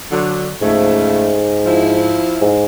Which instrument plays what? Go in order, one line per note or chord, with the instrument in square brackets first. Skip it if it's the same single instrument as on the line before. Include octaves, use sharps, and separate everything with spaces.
[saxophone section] D3 F#3
[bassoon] G#2 [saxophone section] C#3 F3 A3
[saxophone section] F3 E4
[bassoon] G#2